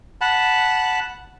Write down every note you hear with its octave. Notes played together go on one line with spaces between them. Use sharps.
F#5 A5 B5